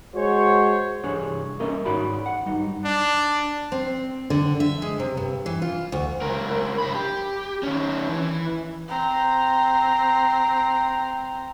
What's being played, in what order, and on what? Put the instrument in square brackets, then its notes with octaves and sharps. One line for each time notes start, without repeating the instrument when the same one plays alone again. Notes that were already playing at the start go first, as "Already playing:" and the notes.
[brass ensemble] G#3 F#4 C5 C#5
[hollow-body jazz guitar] C2 G2 E3 D4 G#4 C#5
G2 A#3 C#4 A#4 D#5 E5
G#2 D#3 F#4 C#5 D5 B5
F#5
G2 G3 D#4
[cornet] D4
[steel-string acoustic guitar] C4
D3
E5
G#3
C3
G2
E3
F4
D2
[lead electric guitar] C#2 A#4
G#2 B5
G4
D#3 C#4
E3
[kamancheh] C4 A#5